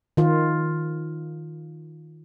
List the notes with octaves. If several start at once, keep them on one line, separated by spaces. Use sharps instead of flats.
D#3 F4